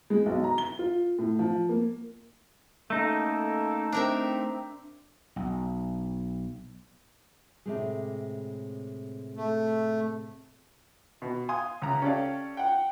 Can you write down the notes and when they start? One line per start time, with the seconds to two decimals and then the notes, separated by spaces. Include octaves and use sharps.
0.10 G#3
0.26 B1
0.44 A#5
0.58 G7
0.79 F4
1.19 A2
1.39 F3
1.69 A#3
2.90 A3 A#3 C#4 D#4 A4
3.92 C4 D4 A#4 E5
5.36 B1
7.65 A2 C3 G#3
9.37 A3
11.22 B2
11.49 F5 G#5 C6 D#6
11.82 C#2 A#5
12.02 C#4 G4 A4 D5 F5
12.57 F#5 G5